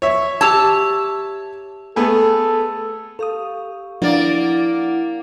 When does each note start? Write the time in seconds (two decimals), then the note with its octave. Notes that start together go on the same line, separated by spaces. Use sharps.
0.02 C#5 E5
0.41 G4 A5 E6 G#6
1.96 A3 B3 G#4 A4
3.19 G4 A4 F5 C#6 D#6
4.02 F3 A#3 D4 E4 D5 F#5